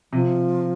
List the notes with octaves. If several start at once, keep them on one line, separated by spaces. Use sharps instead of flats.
C3 F3